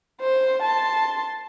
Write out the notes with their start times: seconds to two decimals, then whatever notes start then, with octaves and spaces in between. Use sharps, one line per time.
0.21 C5
0.62 A5 C6